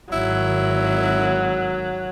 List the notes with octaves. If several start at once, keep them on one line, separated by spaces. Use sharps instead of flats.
G#1 D#3 F#3 E4